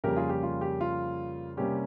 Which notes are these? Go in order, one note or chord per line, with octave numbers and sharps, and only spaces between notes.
F2 C#3 G3 A#3 C#4 G4 A#4
F4 G#4
G4
F4
G4
F4
C3 G3 A#3 C#4 G4